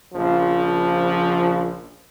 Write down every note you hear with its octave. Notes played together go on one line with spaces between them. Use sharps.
A#1 C#3 F3